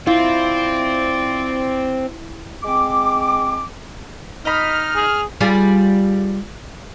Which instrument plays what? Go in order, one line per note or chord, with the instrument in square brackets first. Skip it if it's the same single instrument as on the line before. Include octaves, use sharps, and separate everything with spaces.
[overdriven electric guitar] C4 [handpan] E4 [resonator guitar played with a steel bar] F4 [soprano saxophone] D5
[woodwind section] G#3 C4 D6
[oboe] D#4 [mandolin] D#5 B5 [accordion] F6
[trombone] G#4
[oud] G3 F4 G#4